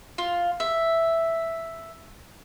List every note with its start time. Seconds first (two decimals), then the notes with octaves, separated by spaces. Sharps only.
0.18 F4
0.60 E5